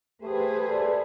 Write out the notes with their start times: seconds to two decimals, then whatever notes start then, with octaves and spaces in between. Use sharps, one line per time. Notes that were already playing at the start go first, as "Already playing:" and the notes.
0.22 A3 G4 G#4 B4 C5
0.69 A4 D5